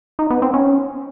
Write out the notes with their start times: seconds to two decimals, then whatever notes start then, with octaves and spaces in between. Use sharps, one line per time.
0.19 D#4
0.30 B3
0.42 C4
0.54 C#4